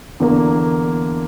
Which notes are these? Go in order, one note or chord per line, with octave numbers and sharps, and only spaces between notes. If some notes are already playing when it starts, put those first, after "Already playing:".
E2 D3 A#3